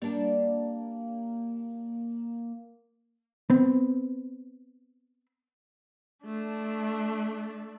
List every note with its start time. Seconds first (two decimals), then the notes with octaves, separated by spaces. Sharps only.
0.02 G3 A#3 D4
3.50 B3 C4
6.25 A3 D4